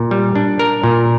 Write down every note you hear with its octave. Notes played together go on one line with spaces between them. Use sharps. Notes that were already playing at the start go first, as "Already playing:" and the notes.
Already playing: A#2
G3
D4
A#4
A#2